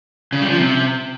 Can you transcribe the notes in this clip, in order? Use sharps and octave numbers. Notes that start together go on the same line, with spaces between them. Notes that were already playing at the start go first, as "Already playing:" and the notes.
C#3
G3
F3
C3